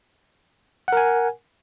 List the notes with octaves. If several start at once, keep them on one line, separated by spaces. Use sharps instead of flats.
A#4 F#5 G#5